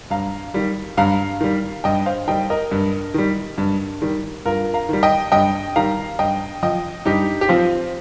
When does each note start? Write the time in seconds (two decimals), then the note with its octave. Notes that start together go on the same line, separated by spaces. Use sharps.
0.10 G2 F5 A#5
0.54 D#3 G3
0.97 G2 F5 A#5
1.41 D#3 G3
1.84 G2 D#5 G5
2.06 C5 F5
2.27 D#3 G3 D#5 G5
2.50 A#4 D#5
2.71 G2
3.14 D#3 G3
3.58 G2
4.02 D#3 G3
4.45 G2 F4 A#4
4.74 F5 A#5
4.89 D#3 G3
5.03 D#5 G5
5.32 G2 D#5 G5
5.76 D#3 G3 F5 A#5
6.19 G2 D#5 G5
6.63 F3 D#5 G5
7.05 G2 D#4 G4
7.41 G4
7.49 F3 C4 F4